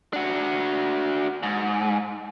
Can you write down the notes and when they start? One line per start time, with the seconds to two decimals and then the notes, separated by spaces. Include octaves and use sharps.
0.13 D4 F#4
1.43 G#2